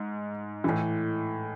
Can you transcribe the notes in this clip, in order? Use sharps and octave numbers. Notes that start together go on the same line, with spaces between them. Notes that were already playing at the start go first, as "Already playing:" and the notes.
Already playing: G#2
A2 E3